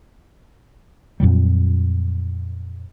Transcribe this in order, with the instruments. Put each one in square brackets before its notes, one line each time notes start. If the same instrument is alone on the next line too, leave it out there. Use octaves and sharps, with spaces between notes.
[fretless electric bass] F2 A#2 F#3 G3